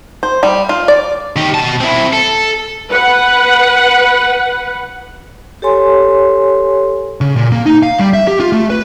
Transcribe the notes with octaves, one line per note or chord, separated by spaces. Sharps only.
C5
G3
F4
D5
D#3 G4
B2 A5
C4 E4
A4
B4 F#5
G4 A4 C#5 G#5 C6
C#3
A#2
A#3
D#4
F5
G3
E5
G4
F4
A3
B4